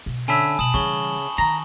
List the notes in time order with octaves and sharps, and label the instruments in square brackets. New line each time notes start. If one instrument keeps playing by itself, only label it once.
[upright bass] B2
[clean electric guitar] D3 C#4 E5 [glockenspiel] G#5 A5 B5
[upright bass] B2 [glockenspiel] D#6 E7 F#7
[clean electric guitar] C#3 [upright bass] E3 G3 [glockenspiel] C#6 G7
[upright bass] D#3 [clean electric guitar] A#5